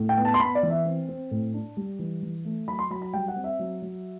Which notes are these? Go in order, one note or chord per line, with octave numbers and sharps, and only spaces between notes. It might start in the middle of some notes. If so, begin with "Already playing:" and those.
Already playing: A2
G5
B3
A5
C6
B3 B5
D5
E3
E5
C4
C4
A2
D4
G3
E3
E3
A3
F#3 B5
C6
F#3 B5
B5
G3 G5
F#5
C4
E5
F#3
F#3